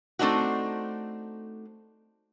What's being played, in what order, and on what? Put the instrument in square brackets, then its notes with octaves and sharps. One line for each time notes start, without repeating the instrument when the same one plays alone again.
[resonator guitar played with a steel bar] A3 C4 D4 D#4 F#4